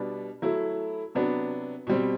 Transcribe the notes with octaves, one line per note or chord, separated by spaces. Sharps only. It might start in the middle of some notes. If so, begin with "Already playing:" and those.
Already playing: B2 G3 B3 D4
F#3 A3 E4
C3 F#3 B3 D4
B2 G3 C4